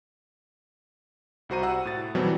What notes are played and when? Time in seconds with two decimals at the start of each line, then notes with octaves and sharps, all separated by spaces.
1.49 C2 G3 F#4 C5 A#5 D#7
1.63 F#5 A#5 E6
1.85 A2 A6
2.15 F#2 B2 E3 F#3 G3 C4